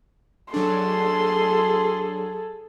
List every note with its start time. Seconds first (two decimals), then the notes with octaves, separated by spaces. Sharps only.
0.54 F#3 D4 G#4 A4 C6